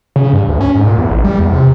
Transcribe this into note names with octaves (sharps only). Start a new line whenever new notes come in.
C#3
G2
D2
C#4
G#2
A#2
E2
A1
G3
E2
C3